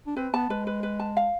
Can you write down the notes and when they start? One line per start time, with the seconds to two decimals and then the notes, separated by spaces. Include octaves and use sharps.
0.07 D4
0.16 C4 B4
0.34 B3 A5
0.49 G#3 B4
0.67 B4
0.83 B4
1.00 A5
1.17 F5